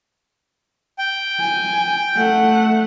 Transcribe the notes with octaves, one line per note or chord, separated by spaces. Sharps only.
G5
G#5
A3 F#5